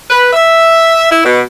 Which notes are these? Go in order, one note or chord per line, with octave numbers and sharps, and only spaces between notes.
B4
E5
E4
B2